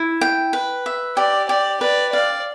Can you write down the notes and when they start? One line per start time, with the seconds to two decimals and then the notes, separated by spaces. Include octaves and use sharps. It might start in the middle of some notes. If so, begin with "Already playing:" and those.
Already playing: E4
0.21 G5
0.53 B4
0.86 E5
1.17 G4 D5
1.49 G4 D5
1.81 B4 D5
2.13 D5 F5